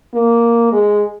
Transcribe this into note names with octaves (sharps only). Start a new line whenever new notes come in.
A#3
G#3